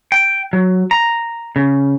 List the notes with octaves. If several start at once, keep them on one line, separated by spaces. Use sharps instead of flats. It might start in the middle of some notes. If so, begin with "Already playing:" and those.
G5
F#3
A#5
C#3